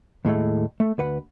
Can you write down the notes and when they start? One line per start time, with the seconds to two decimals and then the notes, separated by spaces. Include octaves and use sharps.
0.25 D#2 A2 G#3 A3
0.80 A3
0.98 D2 B4 F#5